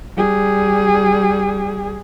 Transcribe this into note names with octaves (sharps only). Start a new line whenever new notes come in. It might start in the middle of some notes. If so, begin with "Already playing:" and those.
G3 G#4